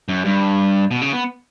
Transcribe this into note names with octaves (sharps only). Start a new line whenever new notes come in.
F#2
G2
B2
C#3
B3